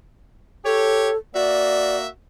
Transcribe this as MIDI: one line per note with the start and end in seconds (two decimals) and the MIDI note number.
0.65 1.10 67
0.65 1.17 69
0.65 1.10 73
1.34 2.07 58
1.34 2.07 66
1.34 1.97 74
1.34 2.07 76